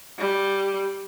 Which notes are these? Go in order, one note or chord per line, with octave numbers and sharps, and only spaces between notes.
G3